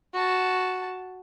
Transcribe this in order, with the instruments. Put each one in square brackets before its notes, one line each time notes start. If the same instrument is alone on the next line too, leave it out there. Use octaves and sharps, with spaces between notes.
[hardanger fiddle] F#4 A5